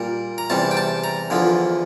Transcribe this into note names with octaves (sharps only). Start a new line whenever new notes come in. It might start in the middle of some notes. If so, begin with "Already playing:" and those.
Already playing: A#2 G3 A#4
A#5
E2 C3 G3 A5
G5
A5
A#5
E2 D3 F3